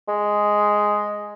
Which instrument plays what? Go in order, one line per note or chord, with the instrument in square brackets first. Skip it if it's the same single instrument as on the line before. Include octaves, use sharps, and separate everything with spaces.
[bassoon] G#3